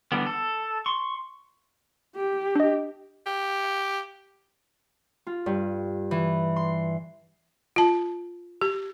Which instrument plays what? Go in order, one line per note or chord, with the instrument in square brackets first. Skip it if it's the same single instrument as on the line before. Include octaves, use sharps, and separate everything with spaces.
[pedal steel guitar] D3 E3 G3 B3
A4
C6 C#6
[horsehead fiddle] G4
[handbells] D4 D#5
[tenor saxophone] G4
[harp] F4
G2
E3
C6
[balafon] F4 A5
G4